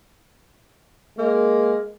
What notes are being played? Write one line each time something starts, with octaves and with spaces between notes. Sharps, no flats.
G#3 A#3